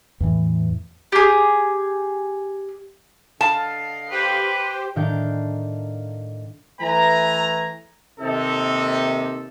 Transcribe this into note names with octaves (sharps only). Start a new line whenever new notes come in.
E2 A2 E3
G4 G#4
D3 D#5 F5 A5
G4 B4 C5 G5
A2 D#3 D4 A#4 F5 G6
E3 A3 B4 E5 G#5 A#5
D#2 C3 D#4 A4